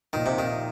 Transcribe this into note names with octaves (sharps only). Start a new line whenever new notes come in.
A#2 D#3 F3 D#4
C3
D#3